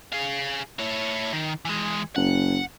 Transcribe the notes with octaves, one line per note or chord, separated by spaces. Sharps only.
G#4 F5
E4 C#5
D#3
E3 G#3
F#1 F#5